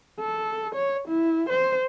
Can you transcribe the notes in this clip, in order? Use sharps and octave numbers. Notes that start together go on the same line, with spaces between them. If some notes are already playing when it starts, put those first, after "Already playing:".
A4
C#5
E4
C5